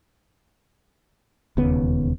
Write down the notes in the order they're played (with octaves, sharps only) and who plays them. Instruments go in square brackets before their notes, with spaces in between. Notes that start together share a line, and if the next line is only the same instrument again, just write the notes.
[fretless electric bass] E1 D#2 C#3 B3